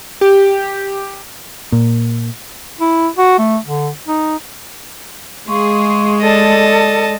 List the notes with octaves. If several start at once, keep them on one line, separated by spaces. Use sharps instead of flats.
G4
A#2
E4
F#4
A3
D3
D#4
G#3 G#4 F5 C6 C#6
A4 D5 D#5 A5